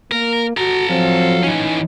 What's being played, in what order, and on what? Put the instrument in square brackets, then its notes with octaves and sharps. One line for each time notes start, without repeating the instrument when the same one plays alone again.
[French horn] A#3 [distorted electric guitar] A#4
[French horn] F#4 [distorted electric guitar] A4 A#5
[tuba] F3 [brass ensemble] F#3 F5 [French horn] C4
[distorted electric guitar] E3 C#4 [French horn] D#4